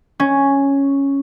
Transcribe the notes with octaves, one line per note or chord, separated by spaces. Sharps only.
C#4